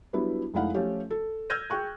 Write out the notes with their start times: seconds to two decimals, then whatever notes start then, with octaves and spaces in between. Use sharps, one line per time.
0.13 F#3 G3 B3 D4 E4
0.54 F1 G#3 D#4 E4 F5 F#5
0.74 F3 A3 C#4 F4 G4
1.11 A4
1.50 E6 F6 G6 G#6 A#6 D#7
1.70 G#4 G5 C#6 F#6